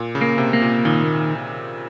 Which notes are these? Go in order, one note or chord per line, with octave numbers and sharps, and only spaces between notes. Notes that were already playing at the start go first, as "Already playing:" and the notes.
Already playing: A#2
C#3
A#3
C3
A#3
A#2
A#2 D#3